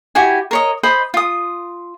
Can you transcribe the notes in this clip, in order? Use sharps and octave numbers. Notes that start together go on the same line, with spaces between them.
E4 F#4 G4 G#5
A#4 C#5 D#5
C5 D#5 B5 C6
F4 D#6